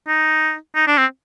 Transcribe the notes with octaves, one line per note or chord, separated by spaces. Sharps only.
D#4
D#4
D4
C4